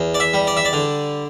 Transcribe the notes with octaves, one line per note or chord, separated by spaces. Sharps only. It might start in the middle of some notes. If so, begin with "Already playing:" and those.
Already playing: E2
D5
E5
G3
D5
E5
D5
D3